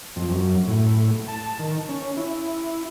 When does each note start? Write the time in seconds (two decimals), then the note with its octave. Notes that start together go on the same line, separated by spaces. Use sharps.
0.16 F2
0.31 F#2
0.67 A2
1.28 A5
1.59 D#3
1.89 C#4
2.17 E4